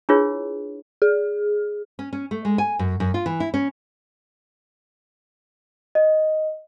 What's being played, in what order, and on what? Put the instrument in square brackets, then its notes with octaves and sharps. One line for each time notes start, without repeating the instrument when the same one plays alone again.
[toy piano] D4 E4 F4 G#4 B4 C#5
[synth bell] G#4
[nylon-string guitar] C#4
C#4
A3
G#3
G#5
F#2
F#2
F4
E3
E4
C#4
[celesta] D#5